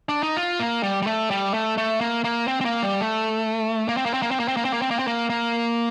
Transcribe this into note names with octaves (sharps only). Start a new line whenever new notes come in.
D4
D#4
F4
A#3
G3
G3
A3
G3
A3
A3
A#3
A#3
C4
C4
A#3
G3
A3
A#3
C4
A#3
C4
A#3
C4
A#3
C4
A#3
C4
A#3
C4
A#3
C4
A#3
A#3